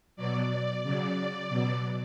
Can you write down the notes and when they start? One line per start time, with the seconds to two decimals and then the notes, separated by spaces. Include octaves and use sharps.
0.16 B2 F#3 D5
0.49 D5
0.83 C#3 F#3 D5
1.49 B2 F#3